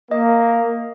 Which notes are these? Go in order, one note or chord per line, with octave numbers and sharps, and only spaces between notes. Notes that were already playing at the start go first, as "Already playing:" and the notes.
A#3 D#5